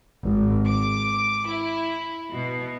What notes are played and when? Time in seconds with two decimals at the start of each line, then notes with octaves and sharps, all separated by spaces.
0.23 G#1
0.66 D6
1.49 E4
2.34 B2